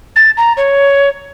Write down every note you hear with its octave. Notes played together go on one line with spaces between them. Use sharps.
A6
A#5
C#5